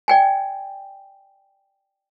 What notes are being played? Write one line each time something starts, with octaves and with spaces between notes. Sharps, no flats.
D5 G5 G#5